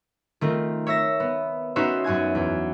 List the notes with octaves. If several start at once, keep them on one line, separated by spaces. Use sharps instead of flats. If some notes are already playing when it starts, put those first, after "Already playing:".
D#3 A3 C4 F4
C#5 E5 E6 A#6
B3
B3 C#4 D#4 F#4 C5 E5
F#2 F#4 G#5 G#6
E2